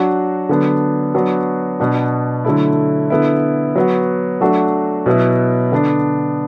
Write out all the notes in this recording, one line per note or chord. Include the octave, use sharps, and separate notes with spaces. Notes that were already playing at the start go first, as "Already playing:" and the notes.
Already playing: F#3 D4 F#4
D3 F#3 B3 D4
F#3 B3 D4 F#4
B2 B3 D4 F#4
D3 F#3 A3 E4
D3 B3 E4
F#3 B3 F#4
F#3 A3 D4 F#4
B2 F#3 B3 E4
D3 B3 D4